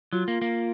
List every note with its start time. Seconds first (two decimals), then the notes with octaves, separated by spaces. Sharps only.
0.12 F#3 F4
0.28 A#3
0.42 A#3